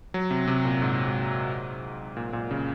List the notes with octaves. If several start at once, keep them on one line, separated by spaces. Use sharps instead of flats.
F#3
C3
C3
A#2
G#2
G#2
A#2
A#2
C#3